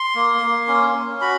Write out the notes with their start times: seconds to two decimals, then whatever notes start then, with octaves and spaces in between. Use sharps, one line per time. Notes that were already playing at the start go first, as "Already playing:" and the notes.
Already playing: C6
0.15 A#3
0.42 A#3
0.68 C#4
0.94 C#4
1.21 F#4 B5